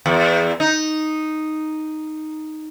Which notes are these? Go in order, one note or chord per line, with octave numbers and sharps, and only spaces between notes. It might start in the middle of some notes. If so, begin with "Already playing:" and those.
E2
D#4